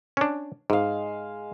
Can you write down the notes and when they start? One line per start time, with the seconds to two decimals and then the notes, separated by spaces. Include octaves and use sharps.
0.17 C#4 D4
0.70 G#2 G#3 F5